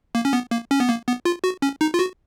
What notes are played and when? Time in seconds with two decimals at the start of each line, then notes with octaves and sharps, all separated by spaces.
0.15 A#3
0.25 C#4
0.33 B3
0.51 A#3
0.71 C#4
0.80 B3
0.89 A#3
1.07 B3
1.25 F4
1.44 F#4
1.62 C#4
1.81 D#4
1.94 F4
1.99 F#4